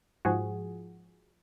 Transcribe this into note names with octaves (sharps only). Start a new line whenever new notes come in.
G#2 F3 F#4 G#4